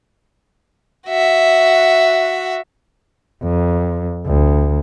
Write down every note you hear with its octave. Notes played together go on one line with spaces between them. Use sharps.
F#4 E5
F2
D2